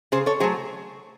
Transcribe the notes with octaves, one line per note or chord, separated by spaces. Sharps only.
C#3 G#4 C5
A4 C#5
F#3 A3 G#4 C5